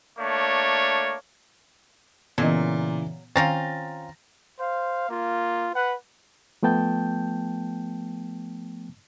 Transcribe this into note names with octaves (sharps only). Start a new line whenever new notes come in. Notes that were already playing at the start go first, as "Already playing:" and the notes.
A3 A#3 D4 C#5
A#2 C#3 E3 F#3 B3 D#5
D#3 C4 C#4 F4 F5 A#5 A6 A#6
C5 F5
A#3 F4
B4 F#5
F3 A3 B3 G5 A5 G6